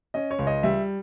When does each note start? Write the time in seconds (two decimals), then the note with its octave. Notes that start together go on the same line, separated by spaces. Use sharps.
0.14 C#4 D#5
0.31 C#5
0.39 C#2
0.47 D#5
0.63 G3 E5